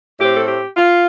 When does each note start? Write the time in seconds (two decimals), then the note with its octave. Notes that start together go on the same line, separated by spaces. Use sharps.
0.20 A2 A3 C4 G4
0.37 A4
0.48 G4
0.76 F4